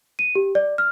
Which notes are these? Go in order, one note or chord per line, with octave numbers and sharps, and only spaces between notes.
D#7
G4
D5
F6